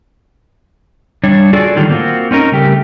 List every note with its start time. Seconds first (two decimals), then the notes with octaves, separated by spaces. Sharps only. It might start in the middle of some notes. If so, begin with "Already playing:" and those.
1.24 G3 D4 C#5
1.53 F4 F#4 G#4 A4 D5
1.75 A2 D3 D#3 F#3 G3 F4
1.90 A#3 C4 F4 F#4
2.31 C4 C#4 D#4 A#4
2.52 C#3 G3 A3 G4 A#4